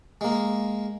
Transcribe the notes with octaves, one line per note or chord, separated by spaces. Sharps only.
G#3 A#3